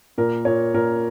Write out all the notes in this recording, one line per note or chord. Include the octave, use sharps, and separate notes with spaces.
A#2 A#4
A#2 C#5
A#2 A#4